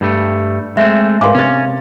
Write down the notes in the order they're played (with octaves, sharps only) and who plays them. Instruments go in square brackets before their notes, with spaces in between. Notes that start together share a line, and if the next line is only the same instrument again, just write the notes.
[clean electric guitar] G2 G3 A3
[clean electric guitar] G#3 A3 C4 [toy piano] E5
[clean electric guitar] G#2 [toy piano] D4 F5 C6 [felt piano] A#4 B4 D6
[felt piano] C3 A6 [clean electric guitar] C#4